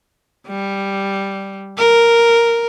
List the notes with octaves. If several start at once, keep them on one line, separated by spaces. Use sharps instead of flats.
G3
A#4